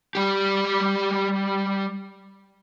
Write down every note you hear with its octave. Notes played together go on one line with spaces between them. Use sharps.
G3 G4